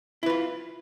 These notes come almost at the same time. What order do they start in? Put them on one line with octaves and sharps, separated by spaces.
E4 B4 F4